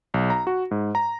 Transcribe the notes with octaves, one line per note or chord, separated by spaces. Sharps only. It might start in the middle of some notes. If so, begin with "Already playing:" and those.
B1
A#5
F#4
G#2
A#5